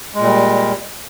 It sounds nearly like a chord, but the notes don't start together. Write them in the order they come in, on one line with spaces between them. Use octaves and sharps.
G#3 A#2 G3